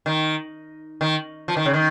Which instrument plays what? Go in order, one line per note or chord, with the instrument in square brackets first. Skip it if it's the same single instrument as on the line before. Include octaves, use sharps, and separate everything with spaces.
[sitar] D#3
D#3
F3
D#3
C#3
D#3